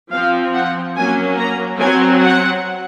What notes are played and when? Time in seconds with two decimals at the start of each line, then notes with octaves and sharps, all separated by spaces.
0.12 F3 C4 F5
0.54 F#5
0.96 F#3 A#3 C#4 G#5
1.39 A#5
1.80 F#3 C4 G#5
2.23 F#5